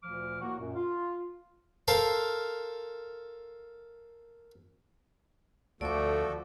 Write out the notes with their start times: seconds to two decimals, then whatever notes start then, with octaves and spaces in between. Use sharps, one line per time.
0.03 D2 A#2 F3 D6 F6
0.39 A2 A#3 F#4
0.58 F#2 A#2
0.75 F4
1.88 A4 A#4 C5 F5 A5
5.81 D2 F3 A3 F#4 A4 D5 D6